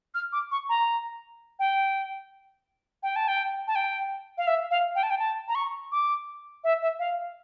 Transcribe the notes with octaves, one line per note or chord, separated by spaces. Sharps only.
F6
D6
C#6
A#5
G5
G5
A5
G5
A5
G5
F5
E5
F5
G5
A5
G5
A5
A#5
C#6
D6
E5
E5
F5